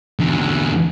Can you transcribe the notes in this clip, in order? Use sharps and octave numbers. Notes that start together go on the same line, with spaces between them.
E2 D3